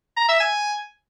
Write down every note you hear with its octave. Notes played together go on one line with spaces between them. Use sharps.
A#5
E5
G#5